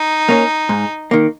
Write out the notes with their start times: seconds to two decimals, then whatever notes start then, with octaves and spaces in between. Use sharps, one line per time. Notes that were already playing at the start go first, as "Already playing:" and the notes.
Already playing: D#4
0.29 A#3 C#4
0.69 G#2
1.11 D#3 A#3